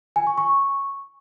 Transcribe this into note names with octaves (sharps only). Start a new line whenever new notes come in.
G#5
C#6
C#6